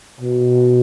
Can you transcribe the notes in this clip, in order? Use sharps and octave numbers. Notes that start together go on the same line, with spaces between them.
B2